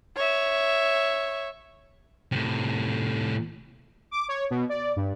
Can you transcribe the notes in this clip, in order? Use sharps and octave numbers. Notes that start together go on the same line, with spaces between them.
C#5 E5
A2 C3
D6
C#5
B2
D5
G2